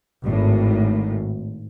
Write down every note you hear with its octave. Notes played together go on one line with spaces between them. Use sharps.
G#1 A2